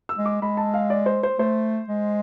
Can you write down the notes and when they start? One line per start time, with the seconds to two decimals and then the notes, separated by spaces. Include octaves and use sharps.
0.09 E6
0.18 G#3
0.26 D6
0.42 G#3 B5
0.57 A5
0.74 F5
0.90 D5
1.06 C5
1.23 C5
1.38 A3 C5
1.88 G#3